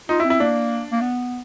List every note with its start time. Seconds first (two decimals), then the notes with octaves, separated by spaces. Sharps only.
0.09 D#4 F4
0.20 E4
0.25 C4
0.30 E4
0.40 A#3 D4
0.92 A#3
1.01 B3